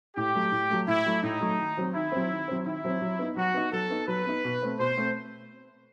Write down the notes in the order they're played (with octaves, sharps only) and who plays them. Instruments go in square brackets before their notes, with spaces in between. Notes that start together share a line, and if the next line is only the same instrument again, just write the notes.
[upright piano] A2 [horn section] G4
[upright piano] F#3 A3
A2
F#3 A3
[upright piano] A2 [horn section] E4
[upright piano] F#3 A3
[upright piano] A2 [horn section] D#4
[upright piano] F#3 A3
D#3
F#3 C4
[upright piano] D#3 [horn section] E4
[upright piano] F#3 C4
D#3
F#3 C4
[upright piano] D#3 [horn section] E4
[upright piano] F#3 C4
F#3
B3 D#4
[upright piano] F#3 [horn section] F#4
[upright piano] B3 D#4
[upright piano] F#3 [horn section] A4
[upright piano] B3 D#4
[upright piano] F#3 [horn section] B4
[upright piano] B3 D#4
B2
A3 C4
[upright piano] B2 [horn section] C5
[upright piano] A3 C4